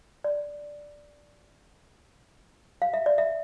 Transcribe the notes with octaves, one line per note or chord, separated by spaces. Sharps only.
D5
F5
E5
D5
E5